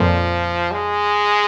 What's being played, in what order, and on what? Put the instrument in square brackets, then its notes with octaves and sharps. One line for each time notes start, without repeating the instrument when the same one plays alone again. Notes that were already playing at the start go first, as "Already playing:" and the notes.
Already playing: [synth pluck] F2 A#2 [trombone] F3
[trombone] G#3